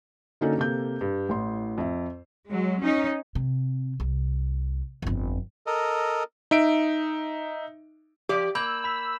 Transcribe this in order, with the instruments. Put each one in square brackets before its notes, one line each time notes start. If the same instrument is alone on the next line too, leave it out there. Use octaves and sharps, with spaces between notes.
[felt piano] D3 A#3 C#4 D#4 F#4 A4
C3 A#3 A4 G6
G2
A1 A2 C6
F2 E5
[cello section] F#3 G#3
C#4 D#4
[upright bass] C3
C2
G1 F2
[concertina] A4 A#4 D#5
[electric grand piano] D#4 E5 D7
[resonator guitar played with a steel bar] F3 D5 [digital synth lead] G4
[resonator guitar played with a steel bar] A#3 [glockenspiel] B5 G6 F#7 [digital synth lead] E6
[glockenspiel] B5 B6